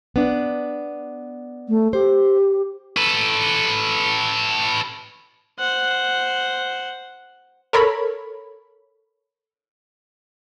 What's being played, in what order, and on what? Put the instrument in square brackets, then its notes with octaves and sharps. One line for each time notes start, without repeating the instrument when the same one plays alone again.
[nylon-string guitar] B3 D4
[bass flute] A3
[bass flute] G4 [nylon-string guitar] C5
[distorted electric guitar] A4 B4
[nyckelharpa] C5 F#5
[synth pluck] A4 A#4 C#5 B5